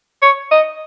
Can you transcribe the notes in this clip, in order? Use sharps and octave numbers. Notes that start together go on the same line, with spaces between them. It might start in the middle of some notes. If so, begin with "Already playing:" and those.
C#5
D#5